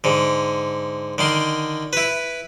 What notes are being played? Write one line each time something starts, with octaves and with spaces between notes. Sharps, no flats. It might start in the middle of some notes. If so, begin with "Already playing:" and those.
G#2 D3
D3 D#3 C6
E4 B4